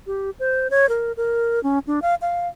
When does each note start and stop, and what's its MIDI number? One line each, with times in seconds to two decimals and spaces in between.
0.07 0.30 67
0.39 0.67 72
0.70 0.89 73
0.89 1.12 70
1.17 1.62 70
1.63 1.79 61
1.87 2.00 62
2.02 2.15 77
2.21 2.48 77